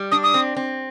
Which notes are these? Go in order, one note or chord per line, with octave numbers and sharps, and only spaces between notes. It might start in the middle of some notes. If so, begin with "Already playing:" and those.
Already playing: G3
D4 D#6
D#6
C4
C4